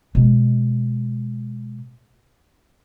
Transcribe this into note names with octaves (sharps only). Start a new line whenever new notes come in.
B2 G#3